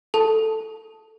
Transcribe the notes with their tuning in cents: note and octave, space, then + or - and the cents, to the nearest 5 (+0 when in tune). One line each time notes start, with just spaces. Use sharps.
A4 +0 A5 +0